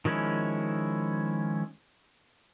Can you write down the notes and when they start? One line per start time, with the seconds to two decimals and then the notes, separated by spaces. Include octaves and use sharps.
0.05 D#3 F3 G#3 C#4 E4